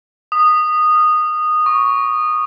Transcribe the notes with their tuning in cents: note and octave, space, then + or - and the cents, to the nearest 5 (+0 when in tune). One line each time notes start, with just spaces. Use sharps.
D#6 -15
E6 +35
C#6 +10